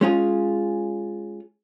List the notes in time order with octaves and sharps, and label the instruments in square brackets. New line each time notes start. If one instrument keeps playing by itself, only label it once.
[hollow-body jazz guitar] G#3 C#4 F4 G#4